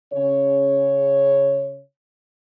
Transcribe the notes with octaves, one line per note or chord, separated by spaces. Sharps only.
C#3 C#5